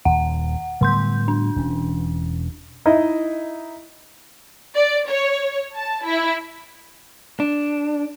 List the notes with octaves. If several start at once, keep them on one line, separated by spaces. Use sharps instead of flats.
D#1 D#2 F#5
A2 D3 G3 B3 C6 G6
D4
E1 E3 C#4
D#4 E4 D#5
D5
C#5
A5
E4
D4